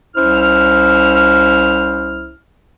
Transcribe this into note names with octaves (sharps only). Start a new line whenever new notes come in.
C2 C#4 E4 C5 F6